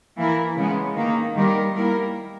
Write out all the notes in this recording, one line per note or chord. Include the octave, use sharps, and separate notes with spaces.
E3 A#3 E4 A#4
C#3 G#3 B3
D#3 A#3 D#4
D#3 G3 B3 G4 A#4
G3 A#3 E4 A#4